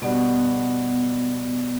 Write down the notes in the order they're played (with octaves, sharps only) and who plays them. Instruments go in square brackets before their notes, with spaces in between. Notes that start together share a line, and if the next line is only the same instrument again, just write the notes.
[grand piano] B2 G3 D4 F#4 [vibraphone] B3